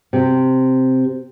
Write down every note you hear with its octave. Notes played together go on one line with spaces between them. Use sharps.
C3